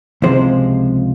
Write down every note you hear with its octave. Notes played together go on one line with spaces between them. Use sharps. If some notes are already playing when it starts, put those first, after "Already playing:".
C#2 C3 F3 G#3 C5